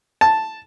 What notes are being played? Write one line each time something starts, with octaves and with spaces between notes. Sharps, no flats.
A5